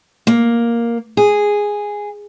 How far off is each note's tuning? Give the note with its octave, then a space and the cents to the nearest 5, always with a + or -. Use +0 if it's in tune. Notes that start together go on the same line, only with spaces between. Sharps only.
A#3 +5
G#4 -5